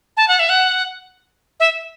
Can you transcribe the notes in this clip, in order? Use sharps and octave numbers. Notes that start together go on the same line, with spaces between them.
A5
F#5
E5
F#5
E5